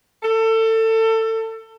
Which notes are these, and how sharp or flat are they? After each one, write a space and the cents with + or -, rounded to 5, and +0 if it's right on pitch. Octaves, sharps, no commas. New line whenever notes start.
A4 +25